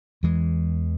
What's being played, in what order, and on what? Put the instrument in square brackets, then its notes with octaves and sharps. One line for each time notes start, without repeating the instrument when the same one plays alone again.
[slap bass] E2 E3 G#3